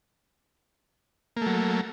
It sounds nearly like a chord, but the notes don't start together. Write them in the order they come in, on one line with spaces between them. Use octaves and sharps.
A#3 A3 F#3